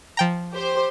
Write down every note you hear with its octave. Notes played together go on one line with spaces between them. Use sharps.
F3 G5 A#5
G4 C5 C6